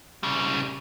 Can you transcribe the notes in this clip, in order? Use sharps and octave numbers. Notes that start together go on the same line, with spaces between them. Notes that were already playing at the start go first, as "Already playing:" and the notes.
C#3 G3